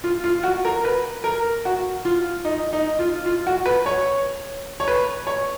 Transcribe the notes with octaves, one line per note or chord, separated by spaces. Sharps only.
F4
F4
F#4
A#4
B4
A#4
F#4
F4
D#4
D#4
F4
F4
F#4
B4
C#5
C#5
B4
C#5